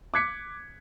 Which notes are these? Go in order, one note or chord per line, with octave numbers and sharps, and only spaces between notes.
D6 F#6 G#6 B6 C#7